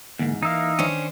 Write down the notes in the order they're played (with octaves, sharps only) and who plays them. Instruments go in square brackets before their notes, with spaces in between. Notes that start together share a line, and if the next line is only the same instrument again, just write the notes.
[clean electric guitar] E2 G#2 [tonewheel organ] D3 A#3
[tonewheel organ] E3 [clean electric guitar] A#3 [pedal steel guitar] D#4 E5 F5
[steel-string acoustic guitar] D#3 D4 C5 [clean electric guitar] C#4